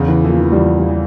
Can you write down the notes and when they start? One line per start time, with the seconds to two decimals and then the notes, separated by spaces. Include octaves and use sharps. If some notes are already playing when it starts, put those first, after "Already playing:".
Already playing: E2 C#3
0.08 E3
0.24 E3 F3 A#3
0.40 E3
0.52 G3
0.56 E2 F3
0.78 G3
0.88 E3